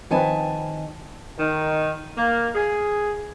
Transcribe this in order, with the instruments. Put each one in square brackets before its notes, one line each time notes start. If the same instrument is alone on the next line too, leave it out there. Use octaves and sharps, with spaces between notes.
[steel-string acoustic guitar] D#3 G#5 A5 [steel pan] F3 C4 B4
[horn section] D#3
A#3
G#4